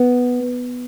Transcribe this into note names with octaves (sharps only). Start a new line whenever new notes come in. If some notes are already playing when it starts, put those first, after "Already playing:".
Already playing: B3